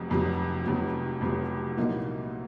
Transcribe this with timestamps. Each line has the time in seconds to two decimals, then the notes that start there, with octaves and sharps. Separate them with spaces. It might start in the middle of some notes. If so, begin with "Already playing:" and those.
Already playing: F1 F2 C3 F#3
0.10 F1 F2 C3 F#3
0.65 F1 F2 C3 F#3
1.21 F1 F2 C3 F#3
1.77 C2 A#2 F#3 A#3 D#4